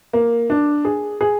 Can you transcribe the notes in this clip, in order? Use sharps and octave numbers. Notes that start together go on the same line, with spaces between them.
A#3
D4
G#4
G#4